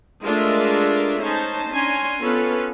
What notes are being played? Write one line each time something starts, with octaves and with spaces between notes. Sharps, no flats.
G#3 A3 D4 F4 A#4 E5
C#4 D#4 C5 A5
C#4 D4 G#5 A#5 C6
B3 C#4 F4 A4 B4